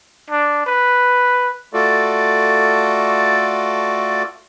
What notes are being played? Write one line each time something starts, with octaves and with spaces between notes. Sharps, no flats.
D4
B4
A3 F4 F#4 A4 D5